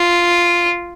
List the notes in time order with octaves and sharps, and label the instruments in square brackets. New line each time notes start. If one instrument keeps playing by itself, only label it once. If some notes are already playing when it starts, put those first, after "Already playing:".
Already playing: [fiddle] F4